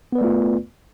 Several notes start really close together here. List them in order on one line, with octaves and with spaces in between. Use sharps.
B3 B4 D5 A3 F4